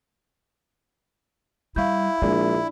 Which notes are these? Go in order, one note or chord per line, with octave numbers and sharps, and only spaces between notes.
G3 E4 F5 C#6 G6
A#1 G#3 D4 D5